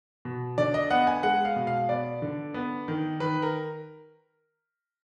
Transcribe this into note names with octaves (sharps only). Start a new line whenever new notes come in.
B2
D3 D5
D#5
B3 F#5
G#5
G#3 F#5
F5
B2
F5
B3 D5
D3
B3
D#3
D#3 B4
A#4